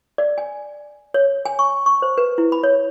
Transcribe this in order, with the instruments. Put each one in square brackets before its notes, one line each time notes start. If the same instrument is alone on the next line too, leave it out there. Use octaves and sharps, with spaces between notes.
[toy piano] D5
G#5
C#5
G#5
C#6
C#6
C5
B4
E4
B5
C#5